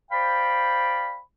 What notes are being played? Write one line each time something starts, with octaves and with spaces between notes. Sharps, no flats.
C5 D5 F5 G5 B5